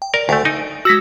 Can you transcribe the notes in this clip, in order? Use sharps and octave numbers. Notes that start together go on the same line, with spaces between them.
G5
A#4 D5
D2 A3 G5 G#5
D#4 D7
G#3 F#4 E6 A#6 B6